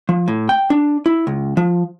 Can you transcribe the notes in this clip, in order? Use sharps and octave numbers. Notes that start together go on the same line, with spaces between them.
F3
A2
G5
D4
E4
C#2
F3